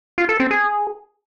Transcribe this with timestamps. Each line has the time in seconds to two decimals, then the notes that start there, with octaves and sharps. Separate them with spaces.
0.18 F4
0.29 A4
0.40 C4
0.51 G#4